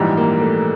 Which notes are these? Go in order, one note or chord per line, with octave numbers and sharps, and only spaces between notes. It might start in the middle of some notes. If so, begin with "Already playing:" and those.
Already playing: A#1 G#2 E3 G3
A#3
A3